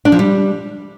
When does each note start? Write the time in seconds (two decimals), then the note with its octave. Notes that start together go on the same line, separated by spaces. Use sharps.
0.05 D4
0.12 F3
0.19 G3